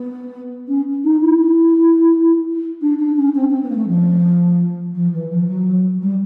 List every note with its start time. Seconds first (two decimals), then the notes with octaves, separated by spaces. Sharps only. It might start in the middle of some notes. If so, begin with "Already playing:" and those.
Already playing: B3
0.68 C#4
1.04 D#4
1.21 E4
2.82 D4
2.99 D4
3.17 C#4
3.35 C4
3.50 C4
3.62 B3
3.70 A#3
3.75 A3
3.88 F3
4.95 F3
5.13 E3
5.31 F3
5.48 F#3
6.02 G3